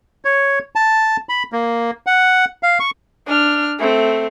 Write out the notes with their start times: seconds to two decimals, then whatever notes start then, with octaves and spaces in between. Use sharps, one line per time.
0.25 C#5
0.76 A5
1.29 B5
1.53 A#3
2.07 F#5
2.63 F5
2.80 C#6
3.26 D4 F6
3.79 A3 C4